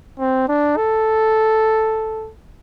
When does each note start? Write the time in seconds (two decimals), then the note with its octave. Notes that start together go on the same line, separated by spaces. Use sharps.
0.20 C4
0.49 D4
0.77 A4